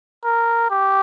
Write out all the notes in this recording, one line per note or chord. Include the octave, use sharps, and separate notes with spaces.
A#4
G4